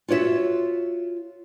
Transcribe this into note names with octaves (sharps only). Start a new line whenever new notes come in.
F4 F#4 C#5 D5 E5